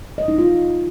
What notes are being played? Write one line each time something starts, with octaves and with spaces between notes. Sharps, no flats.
D#5
D#4
F4